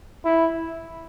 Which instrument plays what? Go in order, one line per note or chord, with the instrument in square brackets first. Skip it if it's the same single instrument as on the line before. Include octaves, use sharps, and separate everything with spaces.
[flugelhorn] E4